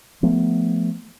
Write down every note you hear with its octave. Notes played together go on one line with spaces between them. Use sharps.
F3 A3 B3